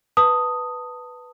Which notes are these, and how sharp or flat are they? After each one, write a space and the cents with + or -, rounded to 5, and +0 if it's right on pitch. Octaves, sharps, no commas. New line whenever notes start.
B4 +0 A5 +25 D#6 +0